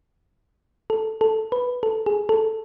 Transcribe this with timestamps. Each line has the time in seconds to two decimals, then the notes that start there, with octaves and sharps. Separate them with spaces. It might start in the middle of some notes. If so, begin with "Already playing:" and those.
0.90 A4
1.21 A4
1.52 B4
1.83 A4
2.06 G#4
2.29 A4